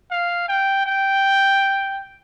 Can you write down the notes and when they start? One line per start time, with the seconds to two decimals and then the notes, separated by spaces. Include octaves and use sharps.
0.11 F5
0.49 G5
0.86 G5